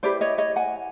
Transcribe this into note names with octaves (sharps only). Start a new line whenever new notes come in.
E4 G4 B4 C5 D5
C#5 D#5
C#5 D#5
F#5 G#5